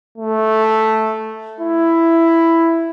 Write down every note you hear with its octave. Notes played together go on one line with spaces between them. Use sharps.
A3
E4